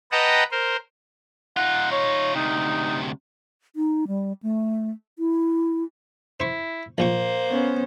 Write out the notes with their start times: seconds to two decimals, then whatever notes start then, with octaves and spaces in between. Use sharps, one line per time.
0.12 B4 D#5 F#5 G5 A5 A#5
0.51 A#4 C5
1.57 D#4 F4 F#5
1.92 C#5
2.35 D2 C3 D#4
3.76 D#4
4.08 G3
4.43 A3
5.19 E4
6.40 E4 C5 C#6
6.98 A#1 A#2 A#3 C5 C#6
7.48 B3 C#4